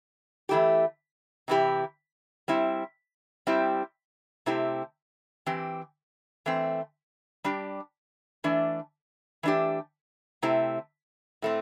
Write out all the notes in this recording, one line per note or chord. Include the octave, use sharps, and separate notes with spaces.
E3 A3 E4 G4
C3 E3 A3 E4 G4
G3 C4 E4
G3 C4 E4 G4
C3 A3 C4 E4 G4
E3 C4 G4
E3 A3 C4
G3 D4 G4
E3 A3 D4
E3 A3 D4 G4
C3 A3 C4 E4 G4
A2 A3 C4